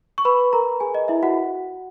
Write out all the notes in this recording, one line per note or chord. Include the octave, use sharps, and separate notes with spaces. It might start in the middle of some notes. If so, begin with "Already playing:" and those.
C#6
B4 B5
A#4 A#5
G#4 G#5
D#5
E4 E5
F#4 F#5